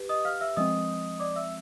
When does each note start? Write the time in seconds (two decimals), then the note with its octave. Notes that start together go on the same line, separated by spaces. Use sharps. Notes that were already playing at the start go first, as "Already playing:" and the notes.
Already playing: G4 B4
0.09 D#5 D#6
0.25 F5 F6
0.41 E5 E6
0.57 F3 G#3 C4 D#5 D#6
1.20 D5 D6
1.36 E5 E6